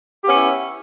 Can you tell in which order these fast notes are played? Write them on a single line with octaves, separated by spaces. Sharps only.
G4 B3 C#4 E4